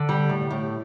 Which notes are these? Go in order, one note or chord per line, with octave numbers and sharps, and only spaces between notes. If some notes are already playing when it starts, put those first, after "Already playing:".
Already playing: D3
G3
A2
A2